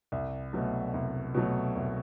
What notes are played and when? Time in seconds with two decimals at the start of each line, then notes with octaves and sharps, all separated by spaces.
0.12 C2
0.53 B2 F#3 A3
0.94 C2
1.35 B2 F#3 A3
1.76 C2